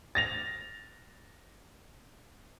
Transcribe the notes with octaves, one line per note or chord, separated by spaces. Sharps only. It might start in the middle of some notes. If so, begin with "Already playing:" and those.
A6 A#6 F7